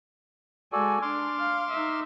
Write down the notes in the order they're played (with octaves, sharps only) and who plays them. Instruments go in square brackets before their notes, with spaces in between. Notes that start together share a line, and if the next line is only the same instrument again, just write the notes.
[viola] G#3 G#5 [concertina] F#4 A4 D5
[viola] D4 [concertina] C6 D6 F6
[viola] F5
D#4 E5